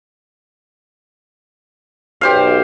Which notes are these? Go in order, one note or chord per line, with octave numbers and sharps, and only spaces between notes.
B1 G4 C5 F5